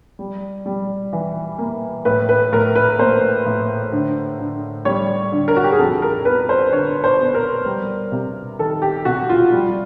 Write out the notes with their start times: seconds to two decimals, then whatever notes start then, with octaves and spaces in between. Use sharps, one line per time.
0.19 G3
0.66 G3
1.13 E3
1.58 A#3
2.05 A2 B4
2.29 B4
2.52 A2 A#4
2.76 B4
2.99 A#3 C5
3.46 A2
3.92 D3
4.39 D3
4.85 G3 C#5
5.32 D3
5.48 A#4
5.57 F#4
5.64 G4
5.72 G#4
5.79 F2 A4
6.02 A#4
6.25 B3 B4
6.49 C5
6.72 D3 C#5
7.04 C5
7.19 B3
7.35 A#4
7.66 G3
8.12 C3
8.59 D#3 A4
8.82 G4
9.05 C3 F#4
9.29 F4
9.52 G3